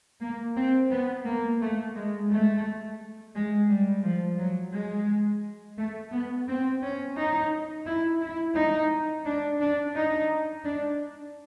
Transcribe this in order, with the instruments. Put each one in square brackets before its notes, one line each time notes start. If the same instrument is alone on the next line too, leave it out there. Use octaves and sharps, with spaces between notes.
[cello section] A#3
C4
B3
A#3
A3
G#3
A3
G#3
G3
F3
F#3
G#3
A3
B3
C4
C#4
D#4
E4
E4
D#4
D4
D4
D#4
D4